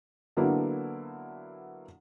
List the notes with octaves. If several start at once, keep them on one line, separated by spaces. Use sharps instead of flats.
D3 F#3 A#3 B3 D4 E4